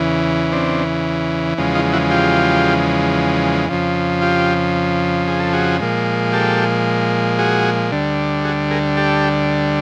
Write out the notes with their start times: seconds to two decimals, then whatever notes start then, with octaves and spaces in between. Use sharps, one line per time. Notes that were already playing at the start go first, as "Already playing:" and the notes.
Already playing: E2 C#3 E3
0.52 C4 D4
1.58 E2 C#3 F3 G#3
1.75 D#4 F4
1.93 E4 F#4
2.10 F4 G4
3.69 F2 C#3 F3
4.21 F4 G4
5.28 G#4
5.40 A4
5.53 F#4 G#4
5.80 A#2 F3 G#3
6.33 G4 A4
7.39 F#4 G#4
7.92 D2 D3 G3
8.45 F#4 G#4
8.71 G#4 A#4
8.97 G4 A4